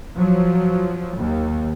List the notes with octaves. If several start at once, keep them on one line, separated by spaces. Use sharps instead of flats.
F3 F#3
D#2